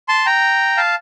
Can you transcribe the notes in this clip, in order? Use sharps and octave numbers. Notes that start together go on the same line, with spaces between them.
A5 C6
G5 A#5
F5 A5